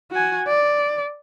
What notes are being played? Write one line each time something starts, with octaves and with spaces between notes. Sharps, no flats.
F#4 G#5
D5